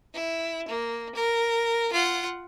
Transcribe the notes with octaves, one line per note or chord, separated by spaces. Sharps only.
E4
A#3
A#4
F4 F#5